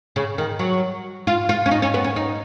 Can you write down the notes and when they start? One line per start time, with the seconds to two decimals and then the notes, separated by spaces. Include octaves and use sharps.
0.16 C#3
0.38 D#3
0.59 F#3
1.27 F4
1.49 F4
1.66 C#4
1.71 D#4
1.82 C#4
1.94 B3
2.04 C#4
2.16 D#4